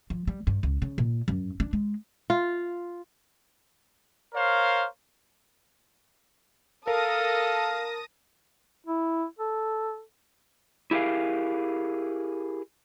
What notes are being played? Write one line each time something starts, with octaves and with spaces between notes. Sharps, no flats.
F3
G3
G2
C#2
C#3
A#2
F#2
D4
G#3
F4
A#4 C5 C#5 F5
A4 A#4 F5 A5 D#6 A#6
E4
A4
E4 G4 G#4 A#4 F5